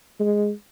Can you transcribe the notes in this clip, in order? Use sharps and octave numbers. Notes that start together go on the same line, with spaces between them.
G#3